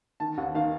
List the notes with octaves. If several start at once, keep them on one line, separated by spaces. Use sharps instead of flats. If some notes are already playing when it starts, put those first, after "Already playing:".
D#3 A5
D#2 F#5
D#3 F5